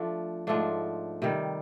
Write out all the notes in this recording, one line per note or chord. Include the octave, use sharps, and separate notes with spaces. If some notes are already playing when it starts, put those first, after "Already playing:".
Already playing: F3 A3 D4
G#2 F3 A3 D4
C3 D#3 G3